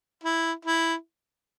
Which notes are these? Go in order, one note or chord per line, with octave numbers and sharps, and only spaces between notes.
E4
E4